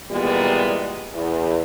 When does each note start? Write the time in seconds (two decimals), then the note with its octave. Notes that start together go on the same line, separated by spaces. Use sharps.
0.10 A#2 D#3 E3 G3 G#3 B3
1.14 E2